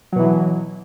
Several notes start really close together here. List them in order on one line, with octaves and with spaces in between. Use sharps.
F#3 B2 E3